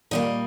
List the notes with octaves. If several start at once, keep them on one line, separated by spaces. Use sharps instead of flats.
A#2 G3 A#3 D#5